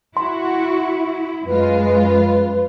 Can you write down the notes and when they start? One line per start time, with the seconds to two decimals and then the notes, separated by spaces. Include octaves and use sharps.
0.17 E4 F#4 C6
1.46 F#2 G#3 F4 B4